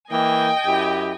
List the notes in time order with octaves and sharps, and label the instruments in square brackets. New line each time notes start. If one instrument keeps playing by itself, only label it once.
[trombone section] E3 A#3 [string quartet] D#5 G5 G#5
[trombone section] F#2 E4 G4